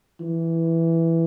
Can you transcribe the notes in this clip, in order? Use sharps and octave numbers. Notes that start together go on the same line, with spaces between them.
E3